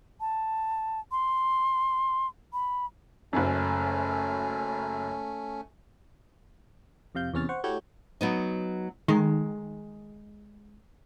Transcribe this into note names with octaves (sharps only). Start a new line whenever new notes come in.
A5
C6
B5
F#1 F#2 A3 C#4
F2 C3 F5 G6
E2 C3 C#4 C#5 F6 A6
C5 F#5 C#6
A3 E4 F#4 G4 C#5 G6
F#3 B3 D#4
D#3 G#3